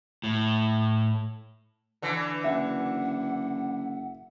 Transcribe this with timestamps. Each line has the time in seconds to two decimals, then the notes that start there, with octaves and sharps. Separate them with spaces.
0.23 A2
2.02 D3 E3
2.44 F#1 E5 F#5